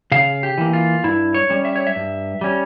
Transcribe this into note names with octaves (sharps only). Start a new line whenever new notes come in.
C#3 F5
G4
E3 A#3
F4
G2 E4
C#5
G3 C#4
E5
C#5
E5
G2
G3 C#4